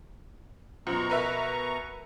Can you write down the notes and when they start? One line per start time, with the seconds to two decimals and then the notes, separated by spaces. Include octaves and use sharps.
0.87 F#2 B2 F3 A#5 C#6
1.10 A#4 B4 E5